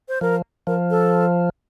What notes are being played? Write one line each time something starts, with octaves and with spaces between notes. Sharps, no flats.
C5
F3 A#4
F3 A#4
A4